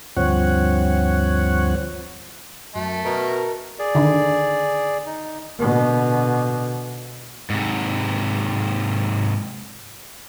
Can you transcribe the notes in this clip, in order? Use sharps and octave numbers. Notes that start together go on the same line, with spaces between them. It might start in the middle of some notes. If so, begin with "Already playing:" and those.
D2 G2 F3 C4 C#5 F#5
F#2 A3
B2 A#4
G#4 D5
D3 D#3
D#4
B2 D3
G#2 C3